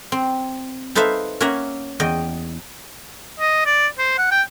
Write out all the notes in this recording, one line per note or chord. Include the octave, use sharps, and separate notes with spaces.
C4
D#4 A4 B4 C5 E5 F5
A#3 C#4 C#5 E5 F#5 A#5
E2 D#5 G5
D#5
D5
C5
F#5
G5